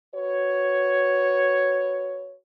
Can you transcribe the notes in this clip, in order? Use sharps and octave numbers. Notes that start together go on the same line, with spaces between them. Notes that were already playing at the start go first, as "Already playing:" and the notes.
F#4 B4 C#5